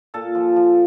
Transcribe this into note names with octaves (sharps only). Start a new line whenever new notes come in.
A#2 A4
F3
F3